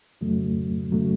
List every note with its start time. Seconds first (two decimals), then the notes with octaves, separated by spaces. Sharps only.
0.21 F2 C#3 F#3 A3
0.92 C#3 F#3 A3